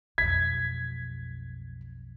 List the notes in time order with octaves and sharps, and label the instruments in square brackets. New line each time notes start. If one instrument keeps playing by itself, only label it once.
[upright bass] B1 F2 [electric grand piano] G#6 B6